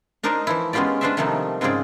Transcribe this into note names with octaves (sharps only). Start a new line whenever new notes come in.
D4 D#4 A#4 C5 D5 D#5
E3 F3 E4
G#3 B3 C#4 F4 G4 D5
D4 F4 B4 C5 D5 E5
C3 D#3 F3 G3 A3 D#4
G#2 C#3 C4 F4 G#4 D5